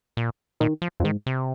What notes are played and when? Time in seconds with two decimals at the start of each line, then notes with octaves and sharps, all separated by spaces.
0.17 A#2
0.60 A#2 D#3
0.82 F3
1.00 F2
1.04 G#2 D#3
1.26 C3